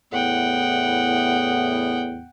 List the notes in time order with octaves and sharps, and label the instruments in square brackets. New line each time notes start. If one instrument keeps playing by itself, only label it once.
[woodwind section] E2 A2 B3 [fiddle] F#5 G5